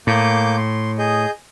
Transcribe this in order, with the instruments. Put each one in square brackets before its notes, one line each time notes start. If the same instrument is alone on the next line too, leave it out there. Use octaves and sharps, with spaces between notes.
[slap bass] A2 [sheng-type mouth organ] A#3 D6 G6
[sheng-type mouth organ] C6
G#4 D#5 G6